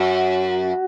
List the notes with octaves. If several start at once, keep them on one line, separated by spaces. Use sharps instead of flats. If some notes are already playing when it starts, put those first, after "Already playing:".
Already playing: F#2 F#4